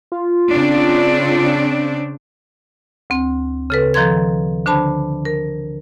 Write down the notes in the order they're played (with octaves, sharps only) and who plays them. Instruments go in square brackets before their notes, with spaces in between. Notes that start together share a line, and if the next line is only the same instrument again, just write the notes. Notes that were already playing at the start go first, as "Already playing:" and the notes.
[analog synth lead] F4
[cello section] C#3 C4 D4
[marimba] D2 C4
C#3 A4 B4
D#3 F3 A4 A#5 C6 G#6
D3 D4 C5 A5 B5
A#4